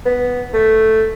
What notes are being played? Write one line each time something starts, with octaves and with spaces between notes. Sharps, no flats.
B3
A3